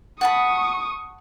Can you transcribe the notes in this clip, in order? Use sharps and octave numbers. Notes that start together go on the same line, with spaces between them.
F#5 A5 B5 C#6 D#6